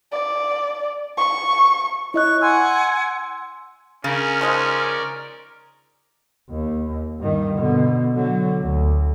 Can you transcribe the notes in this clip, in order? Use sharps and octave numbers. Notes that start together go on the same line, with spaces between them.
D5
C#6
E4 C#5 D#5 C#6 F#6
F#5 G#5 C6 E6
C#3 C#4 A#4 D5
F3 G#3 D#4
D#2
G2 D#3
B2 D3
D3 F#3
D2